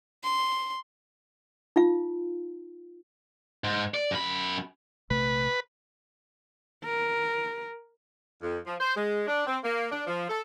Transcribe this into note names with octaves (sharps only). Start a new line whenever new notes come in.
C6
D#4 F4 F5
G#2
D5
F#2 B5
A#1 C3 A3 B4
A#4
F2
F3
C5
G#3
D4
C4
A#3
D4
F3
A4